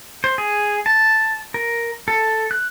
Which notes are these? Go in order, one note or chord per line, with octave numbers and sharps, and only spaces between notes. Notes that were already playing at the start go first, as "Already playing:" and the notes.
C5
G#4
A5
A#4
A4
F#6